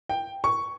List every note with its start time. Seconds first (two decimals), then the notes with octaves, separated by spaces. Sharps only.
0.09 G5
0.44 C#6